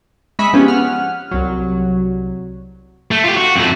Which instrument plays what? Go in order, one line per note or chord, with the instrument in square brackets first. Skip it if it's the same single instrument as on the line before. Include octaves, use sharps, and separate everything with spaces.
[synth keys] G#3 D#5 E5 B5 C#6
F3 B3 C#4 G4 G#4
F#5 F6
C2 F#3
[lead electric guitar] A3
F4 G4
F#4
F2 A3